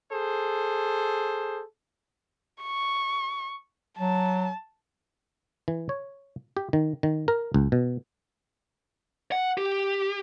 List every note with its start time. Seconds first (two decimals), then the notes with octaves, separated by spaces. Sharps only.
0.11 G#4 A4 C5
2.62 C#6
3.98 F#3 A5
5.68 E3
5.89 C#5
6.57 G4
6.73 D#3
7.03 D#3
7.28 A#4
7.54 C#2
7.72 B2
9.32 F#5
9.58 G4